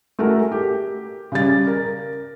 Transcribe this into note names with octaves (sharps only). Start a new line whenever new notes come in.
A3 F#4 G#4 A#4
G4
C#3 G3 A6
A#4